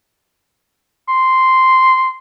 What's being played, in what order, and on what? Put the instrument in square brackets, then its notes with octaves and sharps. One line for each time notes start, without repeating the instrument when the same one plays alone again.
[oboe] C6